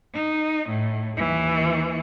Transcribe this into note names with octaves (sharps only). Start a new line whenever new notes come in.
D#4
A2
D#2 E3